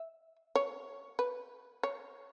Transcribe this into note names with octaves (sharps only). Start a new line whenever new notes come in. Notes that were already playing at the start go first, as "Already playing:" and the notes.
Already playing: E5
C#5
B4
C#5